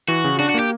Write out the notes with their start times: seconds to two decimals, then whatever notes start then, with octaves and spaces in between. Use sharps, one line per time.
0.08 E3 F#4
0.24 C#3
0.39 D4 F#4
0.49 F#4
0.54 A#3 G4